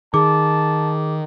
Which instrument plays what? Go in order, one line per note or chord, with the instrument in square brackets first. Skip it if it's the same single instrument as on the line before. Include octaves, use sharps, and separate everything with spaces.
[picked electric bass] D#3 [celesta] G#4 D6 [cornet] A5